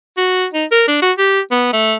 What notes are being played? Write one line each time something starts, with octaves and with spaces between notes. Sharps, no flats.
F#4
D#4
A#4
D4
F#4
G4
B3
A3